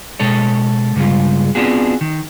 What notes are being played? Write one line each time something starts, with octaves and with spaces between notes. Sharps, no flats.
B2 G#3 A4 C#5
G2 C#3 G3 G#3 F4
B3 C4 D4 F4 F#4 G#4
D#3